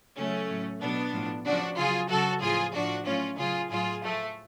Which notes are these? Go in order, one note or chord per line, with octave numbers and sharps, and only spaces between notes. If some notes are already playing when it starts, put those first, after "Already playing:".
C#3 F#3 A3 C#4
A2 F#3
B2 F#3 B3 D4
A2 F3
C#3 F3 D4 F#4
C#3 F#3 F4 G#4
C#3 F#3 F#4 A4
A2 F3 F4 G#4
A2 F3 D4 F#4
A2 F#3 C#4 F4
C#3 F#3 F4 G#4
A2 F#3 F4 G#4
A2 F3 A3